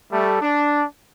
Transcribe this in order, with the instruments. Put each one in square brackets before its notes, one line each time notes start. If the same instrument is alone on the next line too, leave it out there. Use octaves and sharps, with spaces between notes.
[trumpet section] G3 A3
D4